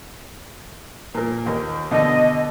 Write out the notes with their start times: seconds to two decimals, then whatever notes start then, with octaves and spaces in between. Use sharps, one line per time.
1.15 A#2 A#4
1.46 D#2 A#4
1.91 B2 D3 D#5